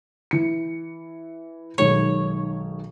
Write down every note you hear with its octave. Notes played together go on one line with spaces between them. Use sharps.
E3 C#7
B1 D#3 G#3 C#5